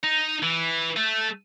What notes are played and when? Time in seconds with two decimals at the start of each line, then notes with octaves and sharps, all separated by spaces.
0.04 D#4
0.42 E3
0.96 A3